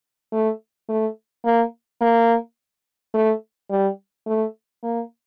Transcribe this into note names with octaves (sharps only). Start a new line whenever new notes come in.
A3
A3
A#3
A#3
A3
G3
A3
A#3